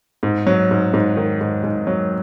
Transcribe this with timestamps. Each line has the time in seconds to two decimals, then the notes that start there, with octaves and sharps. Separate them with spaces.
0.23 G#2
0.47 F#3
0.71 G#2
0.93 G#2
1.17 D#3
1.41 G#2
1.63 G#2
1.87 F#3